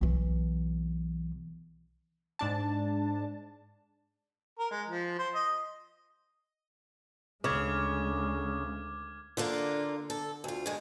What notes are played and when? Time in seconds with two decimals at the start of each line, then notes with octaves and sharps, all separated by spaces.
0.01 B1 E3
2.39 G#2 D4 A5
4.59 A#4
4.71 G#3
4.88 F3
5.19 C5
5.35 D#5
7.44 D2 C#3 G#3 D6 F6 G#6
9.37 D3 A#3 D4 F4
10.10 A4
10.44 D2 F4
10.66 G2 G#3